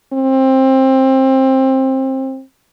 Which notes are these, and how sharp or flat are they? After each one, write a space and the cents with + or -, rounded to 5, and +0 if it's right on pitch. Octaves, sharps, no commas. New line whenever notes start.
C4 +20